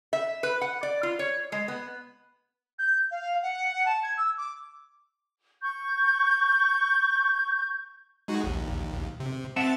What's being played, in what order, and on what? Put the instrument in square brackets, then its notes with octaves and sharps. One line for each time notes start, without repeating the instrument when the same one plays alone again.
[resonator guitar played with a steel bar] E5
B4
F#5
D5
F4
C#5
G#3
B3
[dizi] G6
F5
F#5
A5
G#6
E6
D6
[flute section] C#6 G6
[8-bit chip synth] G#3 D#4 F#4
A#1 D#2
C3
[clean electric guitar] C4 F#5 A5 [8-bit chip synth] E5 A6